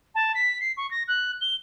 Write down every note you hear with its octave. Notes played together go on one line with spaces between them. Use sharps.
A5
B6
C7
C#6
A#6
F#6
G7